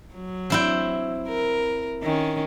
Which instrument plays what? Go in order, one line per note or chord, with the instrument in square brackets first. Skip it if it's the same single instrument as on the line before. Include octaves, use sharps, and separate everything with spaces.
[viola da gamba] F#3
[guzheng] C4 E4 G5
[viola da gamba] A#4
D#3 C#4